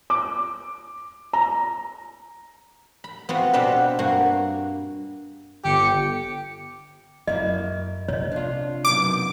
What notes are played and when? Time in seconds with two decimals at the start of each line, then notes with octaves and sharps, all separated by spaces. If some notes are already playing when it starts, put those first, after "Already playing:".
0.10 D6
1.33 A#5
3.04 B5
3.29 B3 C4 F4 F#4
3.53 B2 B3 C4 D4 G4 B4
3.99 G2 A#3 F#4
5.64 G1 G4 D6 C#7
7.28 F#2 A#3 E4 D#5
8.08 C3 C#5 D#5
8.32 D4 F4
8.85 F#2 B2 D#3 D6